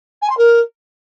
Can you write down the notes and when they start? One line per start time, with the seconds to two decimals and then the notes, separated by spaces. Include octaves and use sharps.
0.22 G#5
0.29 C6
0.37 A#4